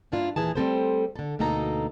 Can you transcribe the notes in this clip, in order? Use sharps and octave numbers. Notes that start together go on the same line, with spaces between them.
G2 A#3 D4 E4 F4
D#2 A#2 E3 G#4 A5
G3 A3 C4 A4 B4 C5
D3 A4
D2 B2 A#3 D#4 A4 A#5